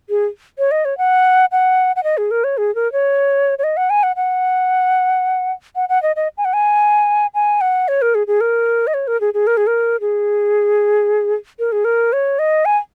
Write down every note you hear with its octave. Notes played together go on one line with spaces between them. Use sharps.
G#4
C#5
D#5
C#5
F#5
F#5
F#5
D#5
G#4
A#4
C#5
G#4
A#4
C#5
C#5
D#5
F#5
G#5
F#5
F#5
F#5
F#5
D#5
D#5
G#5
F#5
G#5
G#5
F#5
C#5
A#4
G#4
G#4
A#4
D#5
C#5
A#4
G#4
G#4
A#4
G#4
A#4
G#4
A#4
G#4
A#4
C#5
D#5
G#5